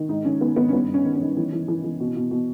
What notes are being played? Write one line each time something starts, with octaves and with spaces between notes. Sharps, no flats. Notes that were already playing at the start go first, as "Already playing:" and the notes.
Already playing: D#3
G#2 D#4
D#3 C#4
D#3 B3
D#3 B3
C#4
G2 B3
G2
C#4
D#3
C#4
D#3
E3
E3
E3
E3
B2
B2
B2